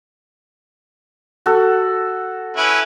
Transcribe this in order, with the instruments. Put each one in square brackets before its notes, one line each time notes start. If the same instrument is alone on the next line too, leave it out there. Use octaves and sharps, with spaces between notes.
[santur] F#4 A4
[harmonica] C#4 E4 B4